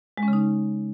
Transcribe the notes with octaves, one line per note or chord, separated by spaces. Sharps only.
G#3
C#4
C#3
D#4